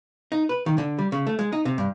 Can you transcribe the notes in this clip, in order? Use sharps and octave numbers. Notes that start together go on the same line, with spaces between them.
D#4
B4
D#3
D3
G3
C#3
A3
G#3
D#4
C3
G2